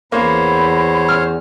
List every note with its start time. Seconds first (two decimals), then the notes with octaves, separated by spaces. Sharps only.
0.12 E2 A#3 C5 C#5 B5
1.09 F6